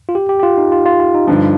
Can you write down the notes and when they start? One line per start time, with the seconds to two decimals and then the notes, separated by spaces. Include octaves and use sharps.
0.09 F4
0.15 G4
0.29 G4
0.40 G4
0.43 F4
0.58 D#4
0.72 F4
0.86 F4
1.00 F4
1.15 D#4
1.27 G2 D3 F3 D#4